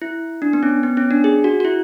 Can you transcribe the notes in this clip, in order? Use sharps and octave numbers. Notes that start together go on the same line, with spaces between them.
E4
D4
B3
C#4
B3
C#4
D4
G#4
F#4
F#4
E4